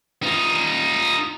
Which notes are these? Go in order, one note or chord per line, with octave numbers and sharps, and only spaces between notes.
D#4 F4